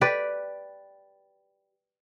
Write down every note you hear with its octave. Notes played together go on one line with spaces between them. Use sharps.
G4 B4 D5